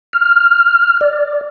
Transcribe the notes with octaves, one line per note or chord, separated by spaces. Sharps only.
F6
D5